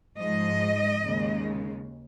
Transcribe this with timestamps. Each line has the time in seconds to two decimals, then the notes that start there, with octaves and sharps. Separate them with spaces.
0.17 G#2 F3 G#3 D#5
1.03 D#2 C#3 G#3